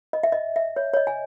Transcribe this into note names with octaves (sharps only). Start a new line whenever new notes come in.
D#5
E5
D#5
E5
C#5
C#5
D#5
G#5